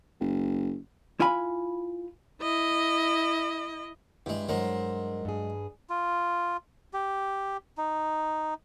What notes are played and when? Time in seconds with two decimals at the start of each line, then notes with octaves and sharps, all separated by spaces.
0.20 F#1
1.20 E4 F4 G#5 B5
2.41 E4 D#5
4.26 G2 G#3 E4
4.49 G2 F#3 G#3 A#4 C5
5.25 G2 G#4
5.90 F4
6.94 G4
7.78 D#4